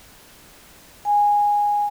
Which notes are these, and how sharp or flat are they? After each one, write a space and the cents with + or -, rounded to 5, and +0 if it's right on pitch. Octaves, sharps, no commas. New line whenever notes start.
G#5 -10